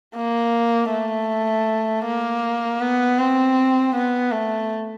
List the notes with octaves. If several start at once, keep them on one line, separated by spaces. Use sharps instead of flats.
A#3
A3
A#3
B3
C4
B3
A3